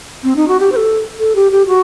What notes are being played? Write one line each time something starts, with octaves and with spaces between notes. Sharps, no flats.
C4
D#4
F#4
G4
C5
A4
A4
G4
G4
F#4